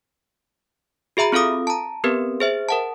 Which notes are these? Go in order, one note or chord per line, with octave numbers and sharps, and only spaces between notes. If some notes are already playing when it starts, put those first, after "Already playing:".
F#4 G#4 E5 A#5 B5
C4 F4 A4 F5 D#6
A5 A#5
B3 C4 G4 A#4 B4
G#4 C5 E5
A#4 F#5 A5